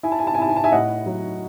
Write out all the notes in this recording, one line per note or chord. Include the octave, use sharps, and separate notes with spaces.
E4 G#5
A5
G#5
A5
G#5
E4 A5
G#5
A5
E5 G#5
A2 D#5 F#5
F#3